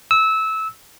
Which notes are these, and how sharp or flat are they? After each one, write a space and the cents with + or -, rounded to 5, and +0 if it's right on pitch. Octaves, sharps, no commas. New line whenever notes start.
E6 -20